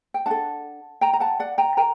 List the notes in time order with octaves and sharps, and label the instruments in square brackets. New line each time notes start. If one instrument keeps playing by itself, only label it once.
[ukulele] G5
D4 A4 F#5 A5
G5 A#5
A#5
F#5 A5
D5 F#5
G5 A#5
A#4 G5 A#5